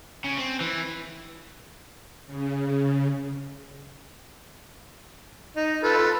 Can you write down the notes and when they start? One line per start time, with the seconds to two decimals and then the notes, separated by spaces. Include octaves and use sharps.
0.24 C#3
0.38 C4
0.61 E3
2.26 C#3
5.56 D#4
5.83 F4 A4 B4